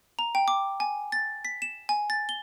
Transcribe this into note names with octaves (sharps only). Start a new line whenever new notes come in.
A#5
G5
D6
G#5
A6
B6
E7
G#5
A6
G7